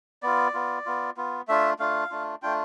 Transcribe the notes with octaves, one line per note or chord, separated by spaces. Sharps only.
B3 F4 D5
B3 F4
B3 F4
B3 F4
A3 D4 F4 E5
A3 D4 F4 F5
A3 D4 F4
A3 D4 F4 G5